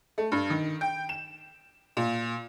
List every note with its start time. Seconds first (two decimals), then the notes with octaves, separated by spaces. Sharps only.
0.18 A3
0.32 G2
0.50 D#3
0.81 G5
1.09 E7
1.97 A#2